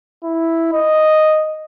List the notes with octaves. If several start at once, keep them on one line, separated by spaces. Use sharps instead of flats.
E4
D#5